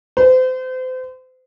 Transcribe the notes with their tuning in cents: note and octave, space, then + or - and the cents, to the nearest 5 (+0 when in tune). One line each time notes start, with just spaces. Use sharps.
C5 -35